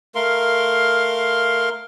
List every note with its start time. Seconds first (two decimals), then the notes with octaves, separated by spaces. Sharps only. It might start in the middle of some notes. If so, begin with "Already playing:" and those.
0.15 A3 A#4 F5 C6